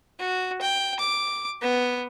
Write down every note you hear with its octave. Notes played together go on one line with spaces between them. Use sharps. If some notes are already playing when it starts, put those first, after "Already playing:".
F#4
G5
D6
B3